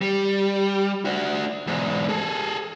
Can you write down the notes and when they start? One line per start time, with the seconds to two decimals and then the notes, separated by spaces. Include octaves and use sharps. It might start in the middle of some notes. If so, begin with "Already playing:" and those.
0.01 G3
1.05 D4 F#4
1.67 E2 G#2
2.09 G#4 A4